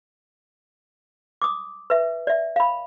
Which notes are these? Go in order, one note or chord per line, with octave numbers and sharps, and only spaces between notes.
D6 D#6
B4 E5
D5 E5
F5 B5